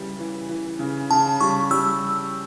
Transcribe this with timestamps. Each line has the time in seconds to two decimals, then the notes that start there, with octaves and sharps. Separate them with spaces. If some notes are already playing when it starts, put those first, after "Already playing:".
Already playing: C#3 E3 G3
0.19 E3
0.49 E3
0.79 C#3
1.11 C#3 A5
1.41 G3 C#6
1.70 G3 E6